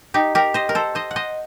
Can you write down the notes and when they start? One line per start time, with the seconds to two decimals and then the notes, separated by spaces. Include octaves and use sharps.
0.14 D#4 G4
0.35 G4 A#4
0.54 C5 D#5
0.69 A#4
0.75 A4 C5
0.95 C5 D#5
1.11 F#5
1.16 C5 D#5